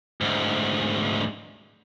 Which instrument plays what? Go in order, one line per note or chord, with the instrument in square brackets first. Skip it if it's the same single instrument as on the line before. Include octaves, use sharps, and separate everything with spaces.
[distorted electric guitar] D2 G#2